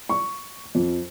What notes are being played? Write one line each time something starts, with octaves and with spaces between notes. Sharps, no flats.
C#6
F2